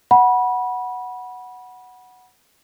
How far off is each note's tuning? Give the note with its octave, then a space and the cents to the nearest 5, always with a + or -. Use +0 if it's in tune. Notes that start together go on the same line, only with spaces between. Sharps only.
F#5 +0 B5 -20